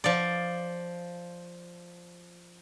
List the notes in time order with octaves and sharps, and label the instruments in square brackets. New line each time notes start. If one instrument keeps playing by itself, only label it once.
[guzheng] F3 D5